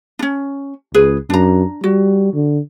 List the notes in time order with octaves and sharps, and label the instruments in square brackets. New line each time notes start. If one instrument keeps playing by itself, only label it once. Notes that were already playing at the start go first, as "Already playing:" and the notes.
[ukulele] C#4 D4
[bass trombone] C#2 [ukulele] G#4 B4
[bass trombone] F#2 [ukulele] D4 A#5
[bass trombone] G3 [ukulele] F#4
[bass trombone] D3